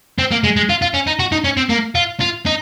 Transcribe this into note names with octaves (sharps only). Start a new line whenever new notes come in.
C4
A#3
G#3
G#3
F4
F4
C#4
D#4
F#4
D#4
C#4
C4
A#3
F4
F4
D#4